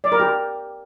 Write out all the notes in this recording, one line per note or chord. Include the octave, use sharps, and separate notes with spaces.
D5
A#4
G4